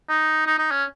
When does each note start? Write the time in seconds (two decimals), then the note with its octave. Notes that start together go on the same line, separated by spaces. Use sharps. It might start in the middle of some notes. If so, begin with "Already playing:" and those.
0.09 D#4
0.47 D#4
0.58 D#4
0.71 C#4